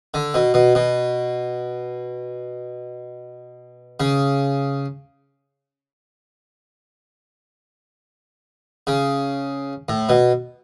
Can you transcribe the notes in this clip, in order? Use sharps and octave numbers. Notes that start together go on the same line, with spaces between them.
D3
B2
B2
B2
C#3
C#3
A2
B2